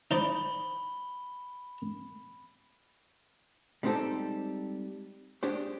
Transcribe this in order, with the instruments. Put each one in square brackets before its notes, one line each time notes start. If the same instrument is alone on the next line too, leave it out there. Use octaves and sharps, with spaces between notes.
[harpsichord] D#4 C5 D5 [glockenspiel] B5 G7
[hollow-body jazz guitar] G3 G#3 C4 D#4 G4 A4
G#3 D4 G4 C5